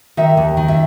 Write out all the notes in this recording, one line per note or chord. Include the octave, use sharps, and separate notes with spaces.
D#3 E5
D#2
D#3
E5